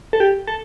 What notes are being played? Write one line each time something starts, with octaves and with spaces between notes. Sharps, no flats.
A4
G4
A4